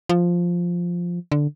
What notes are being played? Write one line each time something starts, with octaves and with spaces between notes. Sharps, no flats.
F3
D3